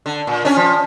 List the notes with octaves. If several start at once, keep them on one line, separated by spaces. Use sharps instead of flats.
D3
A#2
C#4 D4
F3